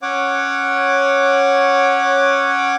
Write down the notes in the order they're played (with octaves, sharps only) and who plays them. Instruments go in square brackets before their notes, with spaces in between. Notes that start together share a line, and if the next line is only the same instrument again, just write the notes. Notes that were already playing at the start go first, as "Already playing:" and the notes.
[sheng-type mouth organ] C#4 C#5 F#5 D6